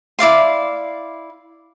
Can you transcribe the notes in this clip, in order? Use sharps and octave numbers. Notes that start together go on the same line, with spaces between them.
E4 D5 F5 C6